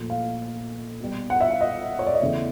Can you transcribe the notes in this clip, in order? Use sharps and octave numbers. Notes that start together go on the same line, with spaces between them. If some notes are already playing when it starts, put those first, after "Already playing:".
Already playing: A#2 F3 A3
F5
B2 G3
F#5
E5
F5
D#5
C#5
D5
D#5
E2 C#3 E3 A3 E5